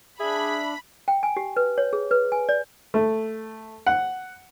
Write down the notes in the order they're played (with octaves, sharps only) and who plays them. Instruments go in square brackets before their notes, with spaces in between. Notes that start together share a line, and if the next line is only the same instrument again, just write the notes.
[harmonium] D4 [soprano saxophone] G#4 [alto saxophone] E5 [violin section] B5
[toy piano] G5
G#5
G4
B4
C#5
G#4
B4
G#5
D5
[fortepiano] A3
F#5